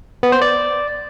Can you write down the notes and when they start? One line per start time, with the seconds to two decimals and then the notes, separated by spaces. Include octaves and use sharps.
0.23 B3
0.32 C5
0.42 D5